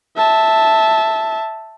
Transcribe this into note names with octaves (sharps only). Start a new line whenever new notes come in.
E5 A5